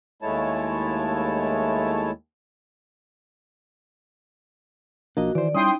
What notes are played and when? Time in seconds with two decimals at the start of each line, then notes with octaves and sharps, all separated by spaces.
0.22 D#2 G#3 A3 E4 C#5 A5
5.17 B1 F3 A#3 D4 F#4 D#5
5.35 D#3 E3 C5 D5
5.54 G3 C#4 D#4 E4 G5 C6 D#6